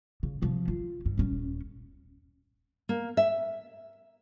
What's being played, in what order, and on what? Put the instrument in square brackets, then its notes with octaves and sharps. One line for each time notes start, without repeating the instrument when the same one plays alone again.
[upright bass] C#3
C3 F3
F4
G2
D#1 C#4
[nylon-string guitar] A#3
E5